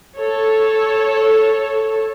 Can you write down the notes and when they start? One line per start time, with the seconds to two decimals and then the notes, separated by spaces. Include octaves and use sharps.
0.17 A4 C#5